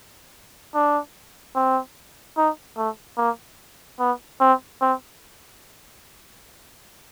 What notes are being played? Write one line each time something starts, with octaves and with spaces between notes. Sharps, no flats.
D4
C4
D#4
A3
A#3
B3
C4
C4